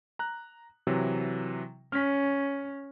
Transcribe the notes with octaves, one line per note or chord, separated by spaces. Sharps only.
A#5 F#6
C3 E3 F#3
C#4 F6 B6